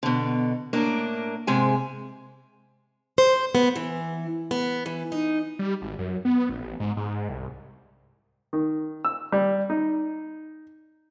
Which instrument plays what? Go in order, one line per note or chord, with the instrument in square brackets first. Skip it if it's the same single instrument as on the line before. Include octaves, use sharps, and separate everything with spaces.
[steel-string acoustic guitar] B2 D3
A2 A#3 D4 A#4
G#2 C3 G#3 G#5
C5
B3
E3
B3
E3
D#4
[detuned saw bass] G3
G#1
F#2
B3
A#1
A1
G#2
G#2
C2
[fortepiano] D#3
E6
G3
D#4